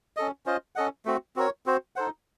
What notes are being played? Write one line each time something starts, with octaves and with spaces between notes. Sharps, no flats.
C#4 A4 D#5
C#4 F4 C5 D#5
C#4 A4 D#5 F#5
A3 C4 F#4
C4 F#4 A#4 C#5
C4 F#4 C5
D#4 A4 C5 F#5